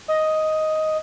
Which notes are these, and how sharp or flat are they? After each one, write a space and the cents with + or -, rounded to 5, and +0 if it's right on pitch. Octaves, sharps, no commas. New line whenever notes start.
D#5 +5